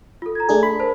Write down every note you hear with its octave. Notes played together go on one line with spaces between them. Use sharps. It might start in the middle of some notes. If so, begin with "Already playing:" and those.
F4 A4
A#5 G#6
A3 D4 G#4
B5
A#4 C5 A5